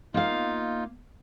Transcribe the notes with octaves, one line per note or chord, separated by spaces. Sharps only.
A#3 D#4 F4 F5